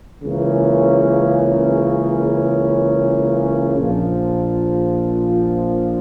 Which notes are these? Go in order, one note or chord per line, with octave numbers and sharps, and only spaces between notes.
C#2 C#3 E3 A#3 C#4
A#1 A#2 F3